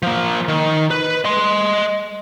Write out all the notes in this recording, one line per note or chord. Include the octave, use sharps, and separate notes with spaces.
F3 A#3
D#3
B4
D#5 C6